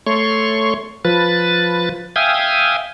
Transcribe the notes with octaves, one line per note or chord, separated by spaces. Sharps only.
A3 C#5 C6 C#6
F3 B4 A6
E5 F5 G5 G#5 D#6